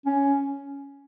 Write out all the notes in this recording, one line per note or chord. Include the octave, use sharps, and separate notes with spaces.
C#4